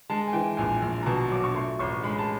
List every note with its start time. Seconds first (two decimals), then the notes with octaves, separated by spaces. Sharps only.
0.10 G#3 A5
0.28 G#5
0.33 E3 G5
0.57 A#1 G#5
0.82 A#1
1.03 A#5
1.06 B2 A5
1.30 F#3 D6
1.44 C#6
1.54 A3 C6
1.79 A1 C#6
2.03 G#3 B5
2.19 A5